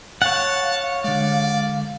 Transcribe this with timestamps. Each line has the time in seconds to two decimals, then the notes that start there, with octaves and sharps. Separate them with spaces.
0.22 C#5 F5 F#5 A5
1.04 D3 G#3 D5